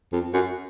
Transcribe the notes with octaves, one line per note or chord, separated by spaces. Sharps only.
F2
F#2